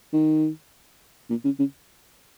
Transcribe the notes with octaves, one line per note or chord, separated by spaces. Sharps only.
D#3
A#2
C#3
C#3